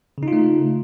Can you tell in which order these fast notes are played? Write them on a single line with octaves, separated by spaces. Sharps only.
C#3 D#4 F4 A3